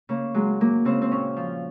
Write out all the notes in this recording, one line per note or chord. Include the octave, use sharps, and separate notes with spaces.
C#3 A#3
F#3 G#3
F#3 A#3
C#3 C4
C4
A#2 C#4
F3